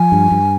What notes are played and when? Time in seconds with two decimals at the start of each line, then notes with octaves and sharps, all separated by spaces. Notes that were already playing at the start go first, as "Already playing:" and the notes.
Already playing: F3 G#5
0.12 G2
0.31 G2